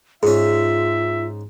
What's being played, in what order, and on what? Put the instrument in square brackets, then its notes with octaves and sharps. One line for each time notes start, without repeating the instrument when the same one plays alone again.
[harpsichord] G#2 C#4 [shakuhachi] F4 [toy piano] G#4 [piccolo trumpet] E5